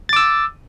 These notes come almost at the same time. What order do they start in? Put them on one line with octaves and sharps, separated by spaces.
A6 D6 E6